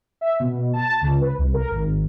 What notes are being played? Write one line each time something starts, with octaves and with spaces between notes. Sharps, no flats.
E5
B2
A5
C#2
B4
C2
A#4
G#1